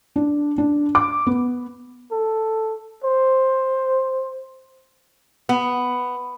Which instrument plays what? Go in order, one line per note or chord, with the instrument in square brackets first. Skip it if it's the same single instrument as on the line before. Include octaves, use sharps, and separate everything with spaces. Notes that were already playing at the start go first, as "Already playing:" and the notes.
[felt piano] D4
D4
D6
B3
[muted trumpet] A4
C5
[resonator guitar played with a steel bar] B3